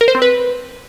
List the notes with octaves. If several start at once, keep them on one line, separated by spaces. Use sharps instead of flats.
A#4
C5
C4
B4